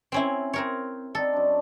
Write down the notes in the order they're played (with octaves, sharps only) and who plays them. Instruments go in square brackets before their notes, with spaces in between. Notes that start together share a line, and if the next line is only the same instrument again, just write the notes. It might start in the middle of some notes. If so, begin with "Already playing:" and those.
[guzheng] C4 C#4 E4
C4 A#4 C#5
[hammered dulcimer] C4 D#4 D5 [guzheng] A4
[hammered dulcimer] F#2 D4